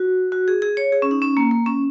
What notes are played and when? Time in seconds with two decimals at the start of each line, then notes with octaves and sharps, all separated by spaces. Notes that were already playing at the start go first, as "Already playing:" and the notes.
Already playing: F#4
0.32 F#4
0.48 G#4
0.62 G#4
0.77 C#5
0.92 G#4
1.02 C#4
1.11 D#4
1.22 C#4
1.37 A#3
1.51 A#3
1.66 C#4